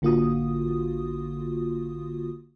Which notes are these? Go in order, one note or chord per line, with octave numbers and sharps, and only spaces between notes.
A1 D3 A#3 F4 F#4 D#6